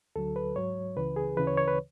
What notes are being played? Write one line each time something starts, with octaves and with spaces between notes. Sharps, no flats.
D2 D3 F#3 A4
B4
G#2 F#3 C#5
C#2 C#3 E3 B4
G#4
D2 C#3 E3 B4
C#5
C#5
B4